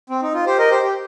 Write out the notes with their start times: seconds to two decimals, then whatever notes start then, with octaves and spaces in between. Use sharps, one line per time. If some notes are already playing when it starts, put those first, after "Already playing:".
0.10 C4
0.22 D#4
0.34 F4
0.46 G4 C5
0.58 A#4 D#5
0.70 G4 C5
0.83 G4